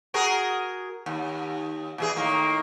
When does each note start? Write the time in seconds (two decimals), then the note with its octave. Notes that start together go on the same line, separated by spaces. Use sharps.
0.14 F#4 G#4 A#4
1.06 D#2
1.98 A#2 E3 G#4
2.16 A2 D#3 A#3